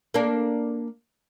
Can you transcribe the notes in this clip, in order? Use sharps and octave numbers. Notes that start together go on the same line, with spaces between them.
A#3 D4